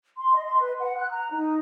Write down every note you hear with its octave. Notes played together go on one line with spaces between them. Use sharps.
C6
D#5
C6
B4
F#5
F#6
A#5
D#4